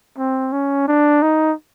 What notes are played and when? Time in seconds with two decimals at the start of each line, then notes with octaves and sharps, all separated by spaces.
0.18 C4
0.52 C#4
0.88 D4
1.22 D#4